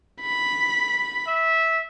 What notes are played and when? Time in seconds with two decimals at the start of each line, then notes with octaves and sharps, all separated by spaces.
0.21 B5
1.27 E5